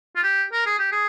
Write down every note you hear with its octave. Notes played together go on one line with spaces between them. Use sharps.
F4
G4
A#4
G#4
G4
G#4